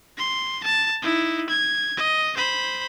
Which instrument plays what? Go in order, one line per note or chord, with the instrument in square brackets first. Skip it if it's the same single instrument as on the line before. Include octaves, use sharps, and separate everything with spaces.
[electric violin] C6
A5
D#4 E4
G#6
D#5
C5 B5